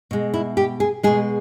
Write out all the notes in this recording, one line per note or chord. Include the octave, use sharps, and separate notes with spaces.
B2 G#3
E4
G4
G#4
B2 G#3 G#4